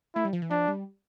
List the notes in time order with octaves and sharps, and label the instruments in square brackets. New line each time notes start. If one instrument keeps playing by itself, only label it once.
[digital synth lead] A3 [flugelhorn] E4
[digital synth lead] G3
F3
E3
[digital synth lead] F3 [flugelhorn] D4
[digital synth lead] G3